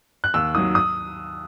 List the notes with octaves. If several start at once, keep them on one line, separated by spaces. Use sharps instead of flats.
F#6
D#2 E6
D#3 F#3 D#6
D#6